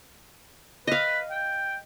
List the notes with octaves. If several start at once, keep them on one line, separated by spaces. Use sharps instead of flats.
B4 D#5 F5
G5